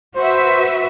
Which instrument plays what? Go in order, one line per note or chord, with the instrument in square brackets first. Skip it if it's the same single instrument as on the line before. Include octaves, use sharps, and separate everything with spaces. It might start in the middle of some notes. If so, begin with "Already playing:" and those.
[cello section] F#4 B4 E5 [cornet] C5